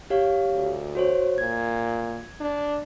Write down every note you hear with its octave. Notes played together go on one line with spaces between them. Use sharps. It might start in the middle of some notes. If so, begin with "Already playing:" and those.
G4 C#5 F5
D2
F#4 C5 C#5
A#2 G#6
D4